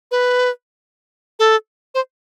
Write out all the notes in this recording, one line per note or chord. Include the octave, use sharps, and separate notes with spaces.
B4
A4
C5